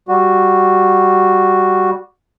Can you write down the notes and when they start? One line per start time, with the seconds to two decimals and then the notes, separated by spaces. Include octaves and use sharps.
0.09 G3 F#4